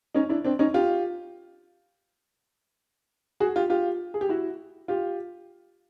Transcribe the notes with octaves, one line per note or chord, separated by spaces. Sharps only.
C#4 D#4
D4 E4
C4 D4
C#4 D#4
F4 G4
F#4 G#4
F4 G4
F4 G4
G#4
G4
E4 F#4
F4 G4